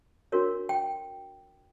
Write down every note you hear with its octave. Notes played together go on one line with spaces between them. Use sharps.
D4 F#4 A#4 C#5
G5